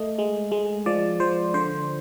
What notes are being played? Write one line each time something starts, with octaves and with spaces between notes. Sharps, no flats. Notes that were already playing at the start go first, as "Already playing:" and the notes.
Already playing: A3 D#5
G#3
G#3
F3 D5
F3 C5
D3 C5